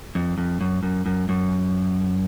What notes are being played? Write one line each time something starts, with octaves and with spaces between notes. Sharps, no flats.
F2
F2
F#2
F#2
F#2
F#2